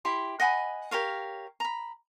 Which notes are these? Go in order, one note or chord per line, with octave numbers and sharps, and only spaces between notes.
E4 G4 C6
D#5 F#5 G#5 B5
G4 A#4 C#5 F5
A#5 B5